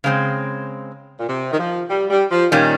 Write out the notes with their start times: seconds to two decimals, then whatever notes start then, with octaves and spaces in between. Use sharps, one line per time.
0.04 C#3 G#3 C4
1.20 A#2
1.28 C3
1.53 D#3
1.59 F3
1.90 G3
2.10 G3
2.32 F3
2.52 A#2 D#3 G3 C#4